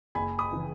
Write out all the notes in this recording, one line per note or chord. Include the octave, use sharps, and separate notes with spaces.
F#1 G#5 B5
B5 D#6
C#3 E3